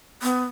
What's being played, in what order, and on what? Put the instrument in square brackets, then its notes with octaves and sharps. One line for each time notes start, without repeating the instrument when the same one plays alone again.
[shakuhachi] B3